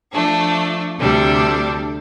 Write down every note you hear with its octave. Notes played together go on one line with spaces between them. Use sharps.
F3 A3 D4
D2 C3 G3 D4 A4